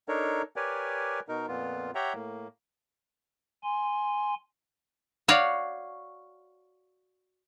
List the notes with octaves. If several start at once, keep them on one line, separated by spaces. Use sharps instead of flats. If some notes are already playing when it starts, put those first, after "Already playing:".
D4 D#4 A4 A#4 C#5
G4 A#4 B4 C#5 D5 G#5
B2 D#4 A#4
F2 A#2 B3 F4
G4 C#5 E5 F#5 G5 A#5
A2 A#3
G#5 C6
F#4 C#5 D5 F5